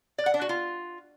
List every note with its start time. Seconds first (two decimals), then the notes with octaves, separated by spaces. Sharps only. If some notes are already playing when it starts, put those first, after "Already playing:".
0.18 D5
0.26 F#5
0.34 D4
0.42 F#4
0.49 F4